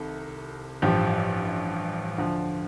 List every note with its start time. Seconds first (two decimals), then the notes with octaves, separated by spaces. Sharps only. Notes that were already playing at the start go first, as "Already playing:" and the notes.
Already playing: C2 C3 D#3 A4
0.82 A1 G2 F3 G4
2.18 D2 D3 F3